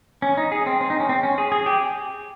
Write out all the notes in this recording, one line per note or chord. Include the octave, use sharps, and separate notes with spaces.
C#4
D#4
G#4
C4
C4
D#4
C#4
C4
C#4
G#4
G#4
G4